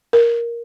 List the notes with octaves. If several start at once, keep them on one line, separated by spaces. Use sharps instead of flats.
A#4